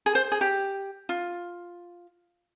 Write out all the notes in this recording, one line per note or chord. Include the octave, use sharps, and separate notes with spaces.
G#4
C5
G#4
G4
F4